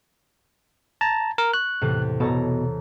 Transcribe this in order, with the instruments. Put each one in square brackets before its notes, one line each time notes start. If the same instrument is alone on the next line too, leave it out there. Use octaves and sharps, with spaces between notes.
[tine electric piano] A5 A#5 [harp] G#6 A6
[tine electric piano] A#4
[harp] C#6 [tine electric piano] F#6
[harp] E2 A2 C3
[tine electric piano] B2 [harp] A4 C#5 A#5